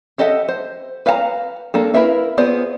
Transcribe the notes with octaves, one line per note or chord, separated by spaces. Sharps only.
G4 A4 D#5 E5 F#5
C5
B4 F5 F#5 A5 A#5
A#3 D4 A4
E4 A#4 B4 E5 F5
B3 F4 G#4 C5 D5